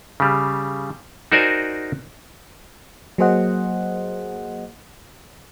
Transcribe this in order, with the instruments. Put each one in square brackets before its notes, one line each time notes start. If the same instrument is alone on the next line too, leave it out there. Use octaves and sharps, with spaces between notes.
[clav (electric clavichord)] C#3 G3
D#4 F#4 A#4 C5 D5 G#5
[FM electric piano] F#3 A#3 G#4 C5 D#5 F#5